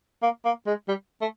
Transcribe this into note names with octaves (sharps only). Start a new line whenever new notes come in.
A#3
A#3
G#3
G3
A3